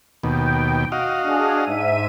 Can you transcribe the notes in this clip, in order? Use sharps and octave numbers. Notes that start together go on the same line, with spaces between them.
D#2 B2 G5
F#4 D#5 F5
D4 G#4
G#2 E5 D#7